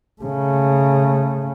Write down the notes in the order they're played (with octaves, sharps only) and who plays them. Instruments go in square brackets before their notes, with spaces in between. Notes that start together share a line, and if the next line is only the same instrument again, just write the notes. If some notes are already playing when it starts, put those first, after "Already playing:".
[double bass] C#3 A3